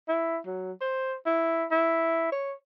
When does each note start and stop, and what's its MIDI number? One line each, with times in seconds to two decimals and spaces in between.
0.09 0.38 64
0.46 0.72 54
0.81 1.15 72
1.26 1.65 64
1.71 2.31 64
2.32 2.54 73